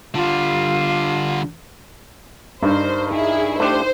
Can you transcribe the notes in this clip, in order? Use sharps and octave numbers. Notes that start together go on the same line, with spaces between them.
D3 G3 F4
G2 D4 D#4 A#4 C5
D#4 E4 G#4
A3 D4 G4 C5